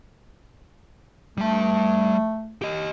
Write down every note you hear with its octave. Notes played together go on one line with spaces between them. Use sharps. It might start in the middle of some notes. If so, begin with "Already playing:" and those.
G3 A3 A5
G4 D#5